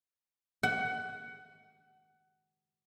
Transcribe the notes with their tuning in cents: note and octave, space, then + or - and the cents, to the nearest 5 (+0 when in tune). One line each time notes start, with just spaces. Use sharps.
F#5 +20